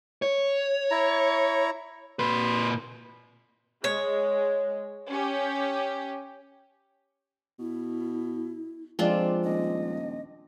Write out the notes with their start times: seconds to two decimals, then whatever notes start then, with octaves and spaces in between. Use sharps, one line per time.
0.22 C#5
0.91 E4 A#5
2.19 A#2 B4 C6
3.84 G#3 C#5
5.10 C#4 G4
7.59 B2 E4
8.99 F2 F3 G#3 C4 D4 F4 D5
9.44 D#1 D#5